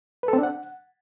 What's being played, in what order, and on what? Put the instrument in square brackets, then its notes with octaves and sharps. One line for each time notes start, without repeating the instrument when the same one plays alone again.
[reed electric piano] B4
A4
C4
D4
F#5